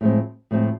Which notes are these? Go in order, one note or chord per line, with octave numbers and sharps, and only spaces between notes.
A2 F3 G#3 C4
A2 F3 G#3 C4